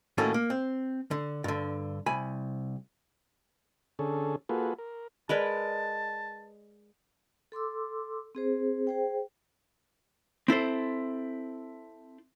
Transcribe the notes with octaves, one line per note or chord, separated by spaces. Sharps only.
D#2 A2 A#3 C#4 F#4 A4
A#3
C4
D3
G2 D3
C2 G#5 B5
D3 C#4 G#4 A4
A#3 F4 F#4 G#4 A4 B4
A#4
G#3 A#4 B4 D5 D#5 A5 B5
A4 C6 D6 E6
C4 G#4 C5
G#4 C5 G5
C4 E4 A4 C5